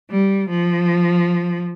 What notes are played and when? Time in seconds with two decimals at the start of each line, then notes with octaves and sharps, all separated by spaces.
0.10 G3
0.50 F3